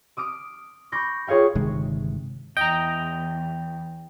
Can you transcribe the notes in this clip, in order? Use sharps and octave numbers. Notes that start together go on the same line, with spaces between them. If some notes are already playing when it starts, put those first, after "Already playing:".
D6 D#6 F6 D7
B5 C#6 D6 G6 A#6
F4 G#4 C#5 F5 G5
G1 C3 D#3 G#3
E2 D#5 G5 A#5